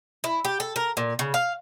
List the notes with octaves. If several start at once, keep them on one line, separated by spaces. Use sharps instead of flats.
E4
G4
A4
A#4
A#2
C#3
F5